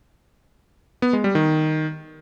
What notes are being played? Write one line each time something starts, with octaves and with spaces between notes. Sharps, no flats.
B3
G#3
G3
D#3